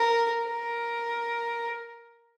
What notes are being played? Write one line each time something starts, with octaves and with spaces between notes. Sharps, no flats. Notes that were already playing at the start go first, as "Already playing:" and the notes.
Already playing: A#4
A#4